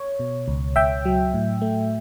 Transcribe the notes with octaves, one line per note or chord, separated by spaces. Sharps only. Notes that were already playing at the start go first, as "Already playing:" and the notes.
Already playing: C#5
B2
C#2
C#2 E5 G5
F#3
A2
A3